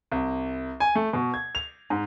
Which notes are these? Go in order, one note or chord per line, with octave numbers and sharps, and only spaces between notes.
C2
G#5
A3
B2
G#6
F7
G#2